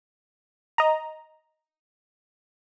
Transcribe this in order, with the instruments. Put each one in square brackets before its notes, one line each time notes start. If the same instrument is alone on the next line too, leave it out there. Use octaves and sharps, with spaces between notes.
[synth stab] D#5 A#5